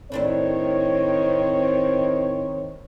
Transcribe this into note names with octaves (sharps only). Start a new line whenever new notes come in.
A2 D#3 C4 D4 E4 C#5